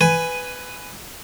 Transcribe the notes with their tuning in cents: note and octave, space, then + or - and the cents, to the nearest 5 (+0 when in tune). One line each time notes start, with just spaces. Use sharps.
B4 +10 G#5 +0